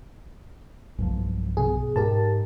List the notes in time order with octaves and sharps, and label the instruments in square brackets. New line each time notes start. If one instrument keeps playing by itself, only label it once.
[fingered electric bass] B1 G2 F3
[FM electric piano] B2 G#4
[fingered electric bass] G#2 [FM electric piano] G4 A#4 A5